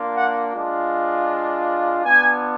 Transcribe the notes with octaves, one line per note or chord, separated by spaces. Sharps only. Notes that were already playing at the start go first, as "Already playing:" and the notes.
Already playing: A#3 D4 F4
F#5
G#3 D4 F4
B3 D4 F4 G#5